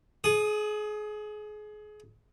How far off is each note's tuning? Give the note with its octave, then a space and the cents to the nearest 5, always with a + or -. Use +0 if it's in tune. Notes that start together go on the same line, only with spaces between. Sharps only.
G#4 +30 D#6 -10